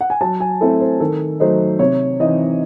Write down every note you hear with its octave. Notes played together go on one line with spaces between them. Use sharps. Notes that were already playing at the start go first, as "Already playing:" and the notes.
F#5
G#5
F#3 A5
G#5
A3 C4 E4 A4
C5
D#3 A4
F#3 A3 D#4 C5
C3 C#5
E3 C4 D#4 D#5